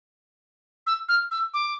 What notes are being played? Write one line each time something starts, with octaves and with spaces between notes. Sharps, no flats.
E6
F6
E6
D6